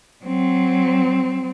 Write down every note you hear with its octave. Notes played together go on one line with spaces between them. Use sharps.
F#3 C4